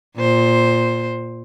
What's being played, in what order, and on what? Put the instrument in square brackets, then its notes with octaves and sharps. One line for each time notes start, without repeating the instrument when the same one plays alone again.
[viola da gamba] A#2 C5